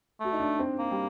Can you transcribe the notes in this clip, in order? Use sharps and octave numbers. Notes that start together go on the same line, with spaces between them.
A3 F#4
D#4
D4
C4
A#3
G3